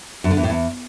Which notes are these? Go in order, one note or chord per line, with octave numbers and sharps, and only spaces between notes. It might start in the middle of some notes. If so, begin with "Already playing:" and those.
F#2
D3
E2
A2
E2